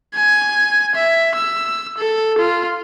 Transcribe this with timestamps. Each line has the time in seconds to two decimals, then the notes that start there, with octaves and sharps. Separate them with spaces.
0.15 G#5
0.95 E5
1.36 E6
1.98 A4
2.39 F4